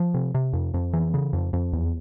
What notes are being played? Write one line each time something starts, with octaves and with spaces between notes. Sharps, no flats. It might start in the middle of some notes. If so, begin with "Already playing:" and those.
Already playing: F3
C3
C3
F2
F2
E3
C#3
F2
F2
E2